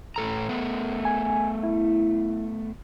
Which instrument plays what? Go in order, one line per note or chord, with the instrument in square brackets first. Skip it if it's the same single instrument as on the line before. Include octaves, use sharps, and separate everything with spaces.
[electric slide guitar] A2 A4 A#5
A3 B3
[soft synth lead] G#5
E4